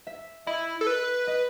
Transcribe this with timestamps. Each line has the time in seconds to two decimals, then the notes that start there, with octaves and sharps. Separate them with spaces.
0.07 E5
0.47 E4 D#5
0.81 A4
0.87 B4
1.27 D#5